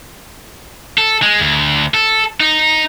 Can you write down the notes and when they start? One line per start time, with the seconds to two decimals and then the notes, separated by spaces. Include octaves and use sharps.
0.98 A4
1.22 G#3
1.40 D2
1.94 A4
2.40 D#4